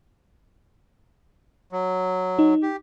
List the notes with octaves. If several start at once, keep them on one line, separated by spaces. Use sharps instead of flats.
F#3
D#4
G4